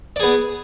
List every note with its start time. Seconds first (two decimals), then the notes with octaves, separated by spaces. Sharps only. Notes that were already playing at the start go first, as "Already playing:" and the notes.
0.16 D5
0.20 G#4
0.23 B3